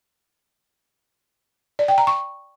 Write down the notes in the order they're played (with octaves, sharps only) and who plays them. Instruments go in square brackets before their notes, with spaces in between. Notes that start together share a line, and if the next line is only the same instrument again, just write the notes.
[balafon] D5
G5
A#5
C#6